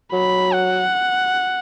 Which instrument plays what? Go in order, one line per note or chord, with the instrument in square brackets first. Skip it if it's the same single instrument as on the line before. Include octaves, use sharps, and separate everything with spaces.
[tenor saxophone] F#3 [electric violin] B5
[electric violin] F#5